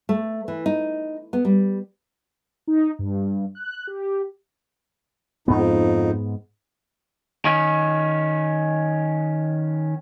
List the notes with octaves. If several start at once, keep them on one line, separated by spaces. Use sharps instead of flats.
A3
E3
D#4
B3
G3
D#4
G2
F#6
G4
F2 G#2 B3 D#4
D#3 C#4